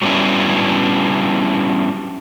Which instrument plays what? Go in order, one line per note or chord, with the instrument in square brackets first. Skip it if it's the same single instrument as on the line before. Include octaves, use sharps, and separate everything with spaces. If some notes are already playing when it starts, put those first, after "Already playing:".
[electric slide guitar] F#3 G3 B3 C#4 D4 E4